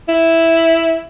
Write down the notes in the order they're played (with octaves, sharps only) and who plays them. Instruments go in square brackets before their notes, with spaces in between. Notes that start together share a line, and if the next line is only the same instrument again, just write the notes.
[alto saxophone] E4